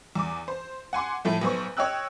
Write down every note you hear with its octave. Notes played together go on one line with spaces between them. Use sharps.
E2 D6
C5
F#5 G#5 C6 D6
A2 F3 A3
B1 B3 C5 C#6
C#5 D#5 G5 E6 F#6